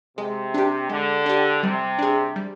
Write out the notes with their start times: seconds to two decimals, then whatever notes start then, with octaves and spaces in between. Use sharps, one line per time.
0.17 C3 G#3
0.54 D4 G4
0.89 D3 G#3
1.26 D4 G4
1.63 C3 G3
1.99 D4 G#4
2.36 G3